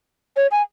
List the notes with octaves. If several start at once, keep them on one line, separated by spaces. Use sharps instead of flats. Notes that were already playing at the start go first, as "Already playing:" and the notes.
C#5
G#5